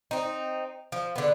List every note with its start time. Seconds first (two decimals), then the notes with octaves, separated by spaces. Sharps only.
0.11 C4 D#4
0.92 F3
1.16 D3 B3